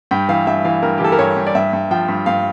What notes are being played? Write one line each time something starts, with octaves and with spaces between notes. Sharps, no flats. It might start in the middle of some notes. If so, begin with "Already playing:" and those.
G2 G5
E3 F5
G2 E5
E3 F5
G2 A#4
G4
E3 A4
A#4
G2 C#5
G2
D5
G2 E5
G2
F3 G5
G2
G2 F5